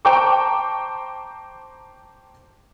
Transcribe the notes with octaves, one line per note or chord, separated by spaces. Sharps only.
C5 G5 A5 A#5 C#6 D6